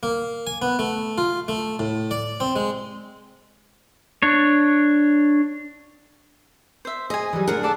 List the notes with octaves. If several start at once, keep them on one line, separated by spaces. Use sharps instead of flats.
A#3
G#5
B3
A3
F4
A3
A2
D5
C4
G#3
D4 C#5
C5 E5
G#4 C5 D#5 G#5
E3 F#3 G3
D2 D4 E4 G#4 A#4 F#5
A4 D5 F#5 A5